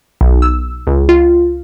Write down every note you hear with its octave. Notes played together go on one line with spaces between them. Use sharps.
B1
E6
C#2
F4